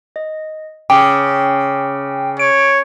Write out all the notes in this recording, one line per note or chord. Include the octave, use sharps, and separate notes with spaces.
D#5
C#3 G5 D6
C#5 D7